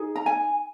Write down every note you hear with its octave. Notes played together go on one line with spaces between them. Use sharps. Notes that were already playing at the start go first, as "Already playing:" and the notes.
Already playing: D#4 G#4
A#5
G#5